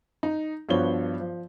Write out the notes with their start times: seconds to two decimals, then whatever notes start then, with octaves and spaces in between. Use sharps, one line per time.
0.23 D#4
0.69 G2 F3 B3 F#4 C#5 G7
1.20 F3